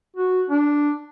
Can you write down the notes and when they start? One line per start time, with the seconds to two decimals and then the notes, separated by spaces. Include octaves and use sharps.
0.16 F#4
0.50 D4